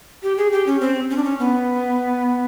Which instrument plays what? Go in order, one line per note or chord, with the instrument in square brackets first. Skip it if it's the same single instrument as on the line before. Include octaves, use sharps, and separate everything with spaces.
[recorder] G4
G#4
G4
C#4
C4
C#4
D4
C#4
B3